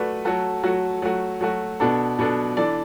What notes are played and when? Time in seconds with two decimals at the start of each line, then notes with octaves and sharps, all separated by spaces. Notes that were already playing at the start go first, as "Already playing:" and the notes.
Already playing: A3 F#4 B4 D5
0.25 F#3 A3 F#4 A4
0.63 F#3 A3 F#4 A4
1.02 F#3 A3 F#4
1.41 F#3 A3 F#4
1.80 B2 B3 D4 A4
2.19 B2 B3 D4 A4
2.57 E3 D4 A4 D5